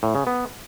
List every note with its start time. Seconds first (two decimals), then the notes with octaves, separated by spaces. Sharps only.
0.03 A2
0.15 C#3
0.27 B3